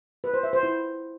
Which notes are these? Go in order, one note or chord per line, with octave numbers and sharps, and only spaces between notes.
B4
C5
E5
C5
E4